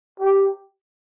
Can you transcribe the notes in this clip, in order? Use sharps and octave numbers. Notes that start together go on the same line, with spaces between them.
G4